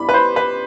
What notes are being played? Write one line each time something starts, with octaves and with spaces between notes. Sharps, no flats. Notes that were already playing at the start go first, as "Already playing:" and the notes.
Already playing: G3 B3 E4 B5
B4
C5
B4